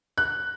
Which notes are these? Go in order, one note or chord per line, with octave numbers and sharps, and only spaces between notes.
F#6